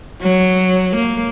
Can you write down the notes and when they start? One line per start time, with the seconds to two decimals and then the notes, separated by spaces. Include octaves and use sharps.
0.22 F#3
0.96 A#3